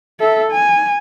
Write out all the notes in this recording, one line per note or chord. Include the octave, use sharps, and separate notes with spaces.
A4 E5
G#5